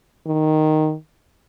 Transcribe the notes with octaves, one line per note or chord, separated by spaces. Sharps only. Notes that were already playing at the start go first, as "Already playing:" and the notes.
D#3